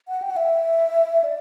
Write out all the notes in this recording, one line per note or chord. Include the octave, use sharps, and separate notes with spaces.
F#5
G5
F#5
E5
D5